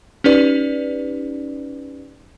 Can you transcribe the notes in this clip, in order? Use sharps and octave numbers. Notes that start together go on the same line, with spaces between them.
C#4 D#4 G4 B4 D5